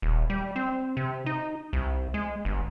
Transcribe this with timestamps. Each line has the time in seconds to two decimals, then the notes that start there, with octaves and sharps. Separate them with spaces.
0.02 D#1
0.30 G3
0.56 C4
0.97 C3
1.26 D#4
1.73 C2
2.14 G#3
2.45 G1